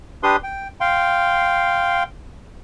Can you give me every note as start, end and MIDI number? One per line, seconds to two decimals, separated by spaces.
0.23 0.36 62
0.23 0.36 67
0.23 0.36 71
0.23 0.36 84
0.23 0.36 87
0.43 0.68 79
0.80 2.03 77
0.80 2.03 79
0.80 2.03 84